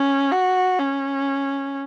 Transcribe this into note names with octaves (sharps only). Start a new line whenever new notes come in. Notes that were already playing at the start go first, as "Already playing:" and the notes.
Already playing: C#4
F#4
C#4